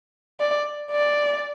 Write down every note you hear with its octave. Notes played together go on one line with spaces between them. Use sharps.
D5
D5